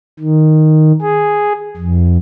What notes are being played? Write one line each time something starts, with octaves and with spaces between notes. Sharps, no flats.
D#3
G#4
F2